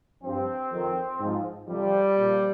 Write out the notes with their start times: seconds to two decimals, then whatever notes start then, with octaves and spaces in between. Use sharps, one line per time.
0.22 G2 F3 C4
0.71 F2 D#3
1.20 G#2 F3
1.68 F2 C3 F3 G3
2.17 A#2 F3